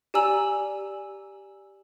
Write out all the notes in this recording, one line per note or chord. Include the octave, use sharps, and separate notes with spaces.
G4 D5 G#5 A#5 E6 F#7